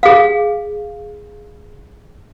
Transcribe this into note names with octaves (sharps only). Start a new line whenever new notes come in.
G#4 F5